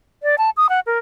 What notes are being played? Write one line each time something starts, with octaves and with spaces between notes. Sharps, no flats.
D5
A5
D#6
F#5
A#4